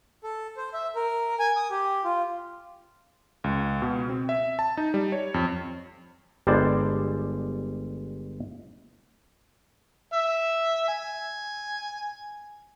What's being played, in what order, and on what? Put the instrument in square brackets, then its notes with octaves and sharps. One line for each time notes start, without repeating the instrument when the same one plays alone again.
[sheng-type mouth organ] A4
C5
E5
A#4
G#5
D#6
G4
F4
[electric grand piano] C#2
B2
C4
E5
A5
D#4
G3
C#5
F2
[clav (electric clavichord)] G1 G3 G#3 C5 D5 A5
[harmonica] E5
G#5